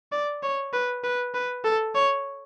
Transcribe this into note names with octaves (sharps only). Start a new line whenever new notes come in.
D5
C#5
B4
B4
B4
A4
C#5